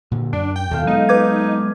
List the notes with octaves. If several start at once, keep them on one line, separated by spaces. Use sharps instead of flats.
A#2 D3
F#2 D4
G5
D#2 B2 A4 E5 F5
F#3 G#3 B3 D#4
B4 G#5 D6 G#6